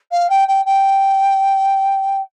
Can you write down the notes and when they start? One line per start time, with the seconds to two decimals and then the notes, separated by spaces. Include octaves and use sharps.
0.11 F5
0.30 G5
0.48 G5
0.65 G5